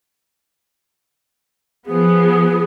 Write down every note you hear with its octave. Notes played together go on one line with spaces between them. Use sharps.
F3 B3 G#4